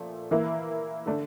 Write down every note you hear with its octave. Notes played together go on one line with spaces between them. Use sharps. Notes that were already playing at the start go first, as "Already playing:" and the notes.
Already playing: A#2 F3 A3
E3 A#3 E4
D3 A3 D4